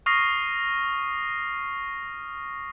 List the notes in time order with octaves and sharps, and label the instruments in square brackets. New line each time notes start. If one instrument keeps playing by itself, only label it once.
[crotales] C#6 D#6 F6 A#6 C7